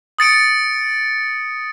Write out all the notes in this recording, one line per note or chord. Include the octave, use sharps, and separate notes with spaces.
D#6 A6 C#7 D7